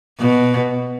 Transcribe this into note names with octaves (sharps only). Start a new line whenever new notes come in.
B2